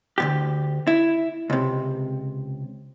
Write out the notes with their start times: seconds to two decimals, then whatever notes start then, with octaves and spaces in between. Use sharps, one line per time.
0.18 D2 G2 G4
0.87 E4
1.50 C#2 C3